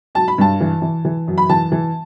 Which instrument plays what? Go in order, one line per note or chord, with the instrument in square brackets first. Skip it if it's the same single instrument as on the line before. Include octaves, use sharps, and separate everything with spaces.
[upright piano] F#3 A5
B5
G2 A5
E3
E3
E3
F#2
B5
E3 A5
E3